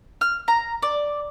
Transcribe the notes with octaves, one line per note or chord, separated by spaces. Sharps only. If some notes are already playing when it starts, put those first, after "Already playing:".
F6
A#5
D5